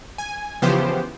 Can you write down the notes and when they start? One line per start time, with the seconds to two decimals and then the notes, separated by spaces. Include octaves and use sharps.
0.18 G#5
0.62 C#3 E3 F3 B3 G4 C5